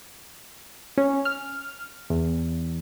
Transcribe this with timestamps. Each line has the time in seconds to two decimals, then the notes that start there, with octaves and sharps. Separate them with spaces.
0.98 C#4
1.25 F6
2.10 E2